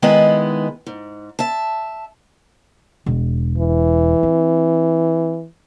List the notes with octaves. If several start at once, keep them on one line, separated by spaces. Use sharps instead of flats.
D#3 G#3 B3 E4 D#5
G#2
E5 A5
E1
E3
C4